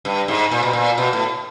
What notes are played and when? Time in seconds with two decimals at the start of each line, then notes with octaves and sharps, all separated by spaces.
0.05 G2
0.28 G#2
0.51 A#2
0.63 B2
0.73 A#2
0.98 B2
1.13 A2